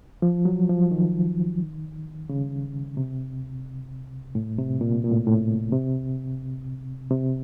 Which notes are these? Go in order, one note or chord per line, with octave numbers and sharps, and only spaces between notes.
F3
F#3
F3
D#3
C#3
C3
A2
C3
A#2
A#2
A2
A2
C3
C3